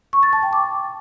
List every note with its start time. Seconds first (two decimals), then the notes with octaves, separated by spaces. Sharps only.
0.13 C#6
0.23 A6
0.33 A5
0.43 G5
0.53 D6